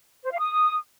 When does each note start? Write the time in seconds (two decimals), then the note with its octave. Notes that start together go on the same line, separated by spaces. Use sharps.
0.24 C5
0.31 F5
0.38 D#6